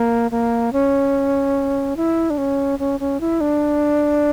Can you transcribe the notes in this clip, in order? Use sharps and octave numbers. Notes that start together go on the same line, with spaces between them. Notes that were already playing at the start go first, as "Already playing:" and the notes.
Already playing: A#3
A#3
C#4
E4
D4
C#4
C#4
C#4
E4
D4